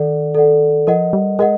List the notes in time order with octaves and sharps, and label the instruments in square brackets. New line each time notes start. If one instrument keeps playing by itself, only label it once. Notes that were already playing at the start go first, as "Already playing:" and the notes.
Already playing: [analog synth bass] D#3 [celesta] A4 D5 F#5
[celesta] A4 D5 F#5
[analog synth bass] F3 [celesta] A#4 D#5 F#5
[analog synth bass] G3
[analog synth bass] G#3 [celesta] A#4 D#5 F#5